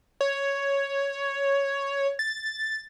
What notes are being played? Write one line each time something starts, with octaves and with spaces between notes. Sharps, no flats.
C#5
A6